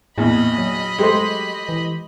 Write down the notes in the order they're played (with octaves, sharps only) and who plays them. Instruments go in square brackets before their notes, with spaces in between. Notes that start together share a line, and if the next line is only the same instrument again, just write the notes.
[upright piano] A#1 [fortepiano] E2 [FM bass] A2 [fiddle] D#5 B5
[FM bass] F#3
[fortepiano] G#3 A3 C5 [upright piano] G4
[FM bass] E3